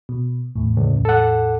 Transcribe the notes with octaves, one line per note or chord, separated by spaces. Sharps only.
B2
E2 A2
C#2
A4 F#5